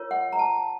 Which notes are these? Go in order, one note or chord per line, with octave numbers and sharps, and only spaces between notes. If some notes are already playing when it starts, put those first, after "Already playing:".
Already playing: F4 A#4 C#5
F#5
A#5
A5